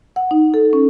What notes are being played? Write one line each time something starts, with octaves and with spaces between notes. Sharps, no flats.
F#5
D#4
A4
C#4